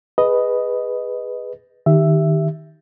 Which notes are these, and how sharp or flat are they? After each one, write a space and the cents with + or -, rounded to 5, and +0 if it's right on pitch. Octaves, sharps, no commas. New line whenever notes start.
G#4 -15 B4 +0 D#5 +0
D#3 +0 G4 +0 E5 +5